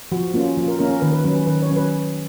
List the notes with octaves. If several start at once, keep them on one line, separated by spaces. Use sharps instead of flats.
F3 F#4
A#3 C#4 F4
F3 F4
A#4
A#3 C#4 A#4
A#4
D#3 B4
B4
F#3 C#4 B4
B4
D#3 B4
C#5
F#3 C#4
B4